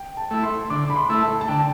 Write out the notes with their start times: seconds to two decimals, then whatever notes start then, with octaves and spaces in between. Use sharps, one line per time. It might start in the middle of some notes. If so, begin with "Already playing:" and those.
Already playing: G5
0.17 A5
0.31 A3 E4
0.43 C6
0.70 D3 D6
0.90 B5
0.96 C6
1.09 A3 E4
1.21 A5
1.41 A5
1.48 D3 G5